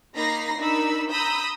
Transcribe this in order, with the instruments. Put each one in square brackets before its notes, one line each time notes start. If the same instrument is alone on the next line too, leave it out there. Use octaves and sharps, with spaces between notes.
[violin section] A#3 D#4 A#5 B5 A#6 C7
D4 D#4 A#4 B5 E6
A#5 B5 D#6 E6 G6